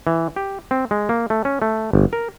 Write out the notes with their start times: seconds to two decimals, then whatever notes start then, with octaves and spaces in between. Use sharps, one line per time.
0.07 E3
0.36 G4
0.71 C4
0.91 G#3
1.09 A#3
1.30 A3
1.45 C#4
1.62 A3
1.93 G1
2.13 A#4